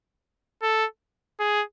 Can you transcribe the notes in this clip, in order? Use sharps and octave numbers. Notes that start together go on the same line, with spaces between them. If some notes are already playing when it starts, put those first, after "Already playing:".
A4
G#4